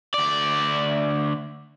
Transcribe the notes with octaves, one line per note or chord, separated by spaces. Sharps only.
D2 D5